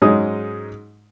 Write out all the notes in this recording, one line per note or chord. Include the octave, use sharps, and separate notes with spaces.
G#2 F#3 G#3 C#4 D#4 D#6